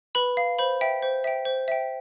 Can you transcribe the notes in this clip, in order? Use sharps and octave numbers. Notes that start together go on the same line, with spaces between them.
B4 B5
F5
C5 B5
E5 G5
C5
E5 G5
C5
E5 G5